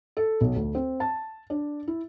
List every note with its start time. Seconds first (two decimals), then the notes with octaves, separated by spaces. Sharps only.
0.17 A4
0.41 B1
0.56 D2
0.75 C4
1.00 A5
1.50 D4
1.88 E4